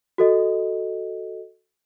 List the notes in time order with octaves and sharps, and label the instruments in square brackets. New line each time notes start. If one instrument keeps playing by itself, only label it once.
[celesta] F#4 A4 D#5